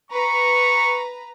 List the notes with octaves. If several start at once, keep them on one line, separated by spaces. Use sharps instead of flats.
B4 A#5 C#6